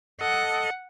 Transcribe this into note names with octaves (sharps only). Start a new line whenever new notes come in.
A4 D#5 F#5